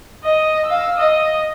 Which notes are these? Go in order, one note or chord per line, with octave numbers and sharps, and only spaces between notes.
D#5
F5 E6
D#5